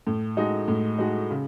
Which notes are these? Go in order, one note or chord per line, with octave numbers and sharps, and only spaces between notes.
A2
G#3 D#4 F#4
A2
G#3 D#4 F#4
C#3